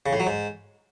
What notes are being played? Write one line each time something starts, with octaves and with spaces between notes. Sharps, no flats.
C#3
A2
F#3
G#2